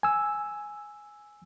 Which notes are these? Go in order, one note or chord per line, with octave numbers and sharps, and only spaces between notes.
G#5 E6